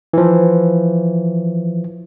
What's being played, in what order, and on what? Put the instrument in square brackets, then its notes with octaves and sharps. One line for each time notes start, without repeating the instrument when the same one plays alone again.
[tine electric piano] E3 F3